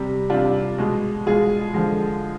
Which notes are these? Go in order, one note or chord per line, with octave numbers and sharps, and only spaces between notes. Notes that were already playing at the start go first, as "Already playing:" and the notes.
Already playing: C3 G3
C3 G3 D4 F4
B2 G#3
B2 G#3 F4 G#4
D3 F3 G#3